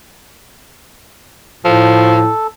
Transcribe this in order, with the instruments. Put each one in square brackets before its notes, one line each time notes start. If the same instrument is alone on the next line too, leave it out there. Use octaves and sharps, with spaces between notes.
[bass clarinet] A2 [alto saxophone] F3 [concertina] A4